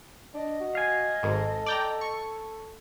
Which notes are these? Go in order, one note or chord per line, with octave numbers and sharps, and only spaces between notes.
D4 D#5
F#4
F5 G#5
G#1 G#2 A4
D5 G5 A#5
C#6